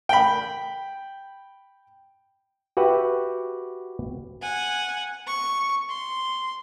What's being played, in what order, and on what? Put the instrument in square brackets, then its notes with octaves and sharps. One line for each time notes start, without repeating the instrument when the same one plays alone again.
[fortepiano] G5 B5
[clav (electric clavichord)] F#4 G4 B4 E5 F#5 G5
[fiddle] F#5 G#5
C#6
C6